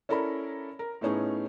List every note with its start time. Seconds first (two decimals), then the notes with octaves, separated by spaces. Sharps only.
0.09 C#4 E4 A4 A#4 D5 B5
0.79 A#4
1.01 A2 A3 B3 C#4 D#4 G#4